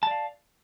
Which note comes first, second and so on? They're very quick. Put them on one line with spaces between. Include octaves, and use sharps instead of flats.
A5 D5 F5